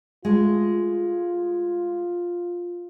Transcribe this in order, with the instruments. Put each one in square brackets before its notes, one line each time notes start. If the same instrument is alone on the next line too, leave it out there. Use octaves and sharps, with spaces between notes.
[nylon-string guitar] G#3 A3 [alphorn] F4